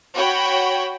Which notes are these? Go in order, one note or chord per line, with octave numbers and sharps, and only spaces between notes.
F#4 C#5 G5 B5